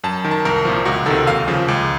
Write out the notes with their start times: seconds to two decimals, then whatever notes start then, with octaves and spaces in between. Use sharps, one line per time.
0.04 F#2 A5
0.25 D#3
0.31 A5
0.45 C2 A#4
0.65 A#2 F3
0.85 C#2 F#4
1.06 C3 D#3 A4
1.26 D#2 F5
1.48 C#3 F3
1.68 C#2